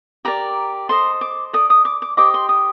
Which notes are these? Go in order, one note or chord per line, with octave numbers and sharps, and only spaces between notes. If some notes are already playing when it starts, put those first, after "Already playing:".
G4 A#4 D5 A#5
A4 C5 D#5 C6
D6
A4 D5 D#6
D#6
D6
D6
G4 C5 D#5 D6
C6
D#6